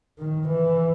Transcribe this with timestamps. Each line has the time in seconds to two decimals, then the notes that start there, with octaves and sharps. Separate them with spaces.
0.19 D#3
0.49 E3